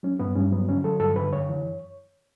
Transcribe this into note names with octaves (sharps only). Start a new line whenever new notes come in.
F#3 C#4
G2 B3
G2 C#4
F#3 B3
D3 C#4
F#3 A4
G2 A4
D3 B4
F#2 C#5
E3